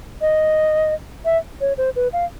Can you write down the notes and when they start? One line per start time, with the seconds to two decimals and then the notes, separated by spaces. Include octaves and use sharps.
0.21 D#5
1.25 E5
1.61 C#5
1.78 C5
1.96 B4
2.13 F5